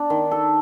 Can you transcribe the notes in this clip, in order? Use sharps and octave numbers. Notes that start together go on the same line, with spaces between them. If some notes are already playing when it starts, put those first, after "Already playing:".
Already playing: D4
D#3
A4